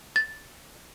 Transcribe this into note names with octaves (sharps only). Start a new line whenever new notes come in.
A6